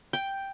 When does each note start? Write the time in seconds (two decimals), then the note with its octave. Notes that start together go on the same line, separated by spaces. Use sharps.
0.13 G5